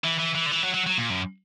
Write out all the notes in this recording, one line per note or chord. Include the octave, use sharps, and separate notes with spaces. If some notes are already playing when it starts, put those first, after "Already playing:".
E3
E3
E3
D3
E3
F#3
F#3
F#3
A#2
F#2